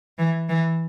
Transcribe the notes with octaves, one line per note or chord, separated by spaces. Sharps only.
E3
E3